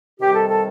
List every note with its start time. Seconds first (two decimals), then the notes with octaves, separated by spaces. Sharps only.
0.20 C3 D#3 G3 G4
0.34 A4
0.50 A4